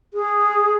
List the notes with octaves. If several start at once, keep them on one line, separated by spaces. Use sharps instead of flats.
G#4